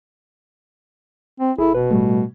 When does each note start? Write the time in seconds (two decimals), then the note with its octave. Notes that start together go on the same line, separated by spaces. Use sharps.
1.40 C4
1.58 F1 E4 G#4 A4
1.75 B2 B4
1.91 A2 G3 A3